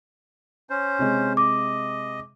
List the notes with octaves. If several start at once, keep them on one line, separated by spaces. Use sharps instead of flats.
C#4 C5
C3 G#3
D#5 D6